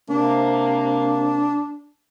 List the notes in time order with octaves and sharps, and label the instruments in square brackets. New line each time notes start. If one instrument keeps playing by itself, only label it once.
[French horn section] C3 A#3 [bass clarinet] D4